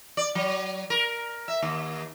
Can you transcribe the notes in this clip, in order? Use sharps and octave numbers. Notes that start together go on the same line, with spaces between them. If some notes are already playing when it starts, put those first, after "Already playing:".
D5
F#3
A#4
E5
D#2